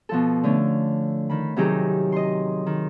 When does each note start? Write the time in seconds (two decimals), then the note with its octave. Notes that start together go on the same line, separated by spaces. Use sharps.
0.09 B2 F3 A4
0.43 D3 A3 C#4
1.30 D#3 B5
1.56 C3 D#3 F#3 D#4 G4 G#4
2.12 D#5 C6
2.66 D#3